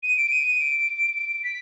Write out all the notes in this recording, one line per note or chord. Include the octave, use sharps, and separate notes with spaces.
D#7
D7
D#7
D7
D7
D7
B6